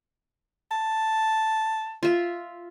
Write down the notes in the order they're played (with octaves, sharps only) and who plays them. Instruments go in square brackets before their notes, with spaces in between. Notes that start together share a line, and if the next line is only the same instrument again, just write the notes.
[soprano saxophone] A5
[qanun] F4 E5